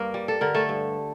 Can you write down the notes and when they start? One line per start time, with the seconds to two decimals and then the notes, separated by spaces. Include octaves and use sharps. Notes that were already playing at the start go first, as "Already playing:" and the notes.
Already playing: G2 A#3 A#4
0.14 G3
0.28 A4
0.41 D3 A#4
0.54 A3 A4
0.69 G2